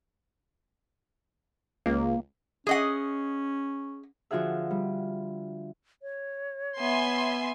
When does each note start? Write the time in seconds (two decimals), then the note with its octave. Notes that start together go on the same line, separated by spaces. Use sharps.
1.86 C#2 A#3
2.67 C#4 G#4 D#5 F#5
4.31 D3 F3 F4 F#4 G#4 E5
4.71 G3
6.02 C#5
6.79 B3 E5 G#5 C6